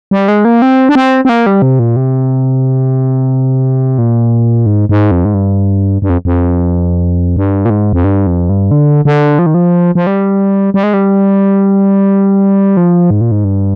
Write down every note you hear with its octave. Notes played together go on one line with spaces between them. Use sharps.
G3
G#3
A#3
C4
D4
C4
C4
A#3
G3
C3
A#2
C3
A#2
G#2
G#2
F2
G#2
G2
G2
F2
F2
G2
A#2
G#2
F2
G2
F2
G2
D3
D3
F3
D#3
F3
F3
G3
G3
G#3
G3
F3
G#2
A#2
G#2
G2